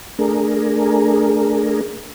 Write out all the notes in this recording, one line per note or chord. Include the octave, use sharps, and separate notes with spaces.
A3 D4 G#4 A#4